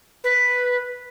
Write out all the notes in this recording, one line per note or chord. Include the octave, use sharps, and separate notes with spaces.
B4